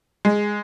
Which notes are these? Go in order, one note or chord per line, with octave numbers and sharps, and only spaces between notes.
G#3